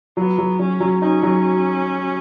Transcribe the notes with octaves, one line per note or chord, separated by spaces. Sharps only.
F#3 B3
F#3
F#3 C#4
F#3
C#4 D#4
F#3